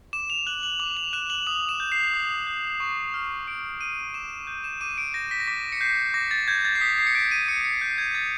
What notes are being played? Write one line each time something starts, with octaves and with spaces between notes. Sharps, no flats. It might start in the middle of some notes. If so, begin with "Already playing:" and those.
D6 E7
F7
F#6 F#7
F#7
D6 F#7
F7
F#6 E7
F#7
D#6 F7
E7
G6
C7
D#6
G6
C#6
F6
C#6 D7
F6 D#7
D6 E7
G6
E7
D6 D#7
D7
G6 A#6
B6
A#6
D6 B6
C#7
G6 C7
D6 A#6
A6
G6 G#6
A6
C7
D#6 B6
C7
C#7
G6 D7
D#7
D#6 C#7
C#7
G6 C7
G#6
D#6 A6